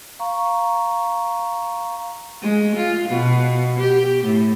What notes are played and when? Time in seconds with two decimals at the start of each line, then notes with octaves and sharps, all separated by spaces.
0.19 F5 A#5 C#6
2.42 G#3
2.76 F4
3.09 B2
3.80 G4
4.24 A2